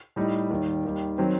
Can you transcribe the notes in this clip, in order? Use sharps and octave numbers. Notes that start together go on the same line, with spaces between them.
A2 G3 D#4
D#2 D#3 G3
D#2 D#3 G3
D#3 F#3 C4